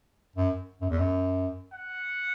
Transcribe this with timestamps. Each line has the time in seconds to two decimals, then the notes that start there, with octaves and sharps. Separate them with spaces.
0.36 F#2
0.81 F#2
0.90 E2
0.98 F#2
1.73 F#5